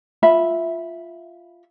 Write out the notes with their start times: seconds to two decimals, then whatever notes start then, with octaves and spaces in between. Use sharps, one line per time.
0.23 F4 E5 B5